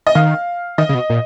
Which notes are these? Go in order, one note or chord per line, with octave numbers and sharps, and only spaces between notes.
D#5
D#3 F5
D#3 D#5
C#3
B2
A#2